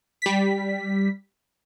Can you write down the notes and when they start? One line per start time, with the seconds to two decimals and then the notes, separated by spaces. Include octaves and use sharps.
0.22 G3 B6